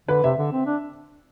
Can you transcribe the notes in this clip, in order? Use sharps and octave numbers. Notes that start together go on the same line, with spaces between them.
D3 B4
C3 E5
D3
C4
D4